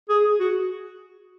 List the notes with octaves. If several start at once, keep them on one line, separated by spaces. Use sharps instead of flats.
G#4
F#4